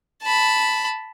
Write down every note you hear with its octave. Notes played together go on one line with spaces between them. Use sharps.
A5 B5